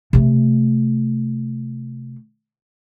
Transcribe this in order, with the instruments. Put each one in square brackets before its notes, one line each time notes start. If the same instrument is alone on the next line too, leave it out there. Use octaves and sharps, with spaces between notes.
[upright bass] C3 A3